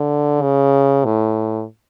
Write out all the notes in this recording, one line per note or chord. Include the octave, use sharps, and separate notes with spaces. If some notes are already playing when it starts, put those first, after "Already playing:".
Already playing: D3
C#3
A2